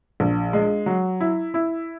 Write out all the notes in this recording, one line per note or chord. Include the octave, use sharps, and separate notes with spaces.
A#1
G#3
F#3
E4
E4